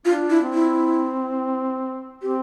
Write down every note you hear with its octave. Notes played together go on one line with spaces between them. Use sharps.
D4 F4
E4
C4
E4
C4 G4